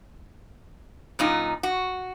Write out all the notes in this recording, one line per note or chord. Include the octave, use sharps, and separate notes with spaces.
F#2 A#2 D#4
F#4